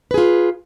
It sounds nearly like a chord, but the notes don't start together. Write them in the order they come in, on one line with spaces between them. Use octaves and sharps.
B4 G#4 F4